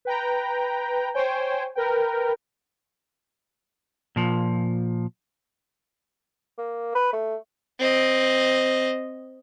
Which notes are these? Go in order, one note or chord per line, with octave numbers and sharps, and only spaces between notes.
B4 G5 A#5
C5 C#5 G5 G#5
A#4 B4 G5
A#2 F3
A#3
B4
A3
C4 D#5